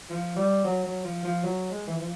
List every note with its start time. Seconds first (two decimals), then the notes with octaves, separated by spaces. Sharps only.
0.10 F3
0.36 G3
0.64 F#3
0.84 F#3
1.05 F3
1.25 F3
1.44 F#3
1.71 G#3
1.87 E3
1.99 F3